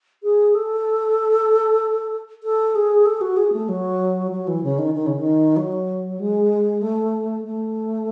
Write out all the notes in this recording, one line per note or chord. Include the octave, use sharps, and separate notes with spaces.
G#4
A4
A4
G#4
A4
F#4
G#4
A3
F#3
F#3
E3
C#3
D#3
D#3
C#3
D#3
F#3
G#3
A3
A3